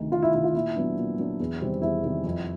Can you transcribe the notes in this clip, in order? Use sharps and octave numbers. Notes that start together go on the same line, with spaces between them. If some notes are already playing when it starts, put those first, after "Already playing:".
Already playing: D2 C3 D#3
D2 F4
E4
C3 D#3 E4
F4
A#2 E4
F#3 B3 D4
A#2
F#3 B3 D4
E2
C3 D#3 G3 C4
E2 E4
C3 D#3 G3 C4
F2